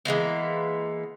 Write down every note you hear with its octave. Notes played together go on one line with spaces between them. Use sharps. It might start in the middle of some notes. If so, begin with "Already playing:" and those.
E3 G#3 A#3 B3